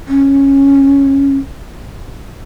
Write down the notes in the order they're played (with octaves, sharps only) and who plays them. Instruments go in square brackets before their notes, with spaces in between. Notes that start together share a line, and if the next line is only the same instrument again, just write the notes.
[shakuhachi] C#4